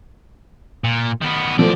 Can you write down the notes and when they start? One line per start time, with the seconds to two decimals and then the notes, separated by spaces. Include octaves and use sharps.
0.84 A#2
1.22 D#3 B3
1.59 E3 F3 A3 D5